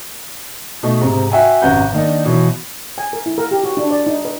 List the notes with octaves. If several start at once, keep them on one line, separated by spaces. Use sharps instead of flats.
B2 A3 D#4
G#2 C3
F#4 E5 G5 G#5
G#1 F#2 C3 B4 F#5 G6
D#3 A#3 D4 D#4
B2 E3 F#3
G#5
A#4
E4
A#4
G4
F#4
D4
D5
D#4
B4